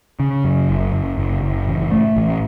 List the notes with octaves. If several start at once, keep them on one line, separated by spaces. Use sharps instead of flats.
C#3
F#2
F#1
F#1
F#1
F#1
A1
A3
A1